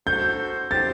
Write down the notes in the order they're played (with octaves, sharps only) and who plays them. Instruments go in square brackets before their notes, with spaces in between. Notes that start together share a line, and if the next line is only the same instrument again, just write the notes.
[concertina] F#4 A4 C5 [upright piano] G6
[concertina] C4 G4 C5 [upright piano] A6